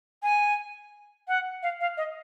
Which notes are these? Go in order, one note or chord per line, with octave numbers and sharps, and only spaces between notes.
G#5
F#5
F5
F5
D#5